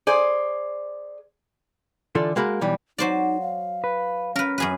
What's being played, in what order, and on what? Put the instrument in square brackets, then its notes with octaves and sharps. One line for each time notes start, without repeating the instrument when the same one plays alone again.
[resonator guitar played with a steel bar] G#4 C5 D5
[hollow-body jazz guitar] D3 E3 F4 A4
G#3 A#3 F#4 B5
B1 E3 G3
[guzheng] F#3 C5 D5 [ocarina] D#4
[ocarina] F5
[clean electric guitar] B4
[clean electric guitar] C#4 [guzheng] A#4 B4
[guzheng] F#2 G#4 B4